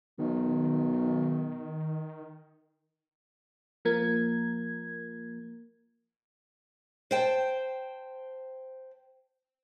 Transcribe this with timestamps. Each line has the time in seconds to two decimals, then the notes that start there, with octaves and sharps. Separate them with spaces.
0.19 B1 D#3
3.85 F3 A#3 A#4 G#6
7.11 C5 G5 A5